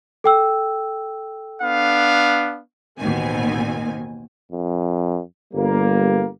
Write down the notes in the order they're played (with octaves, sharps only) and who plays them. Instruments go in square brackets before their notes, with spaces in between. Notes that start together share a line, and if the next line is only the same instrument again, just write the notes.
[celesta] A4 G5 E6
[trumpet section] B3 D4 F5
[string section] A1 D#2 B2 D#3 C4 G#5
[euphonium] F2
[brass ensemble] G1 G3 A#3